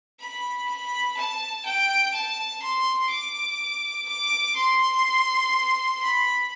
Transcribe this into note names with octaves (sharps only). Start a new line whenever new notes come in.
B5
B5
A5
G5
A5
C6
D6
D6
C6
B5